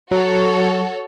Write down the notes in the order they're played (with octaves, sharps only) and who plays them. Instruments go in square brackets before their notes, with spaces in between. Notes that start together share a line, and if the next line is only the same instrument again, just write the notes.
[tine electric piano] F#3 [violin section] F#4 A4 C#5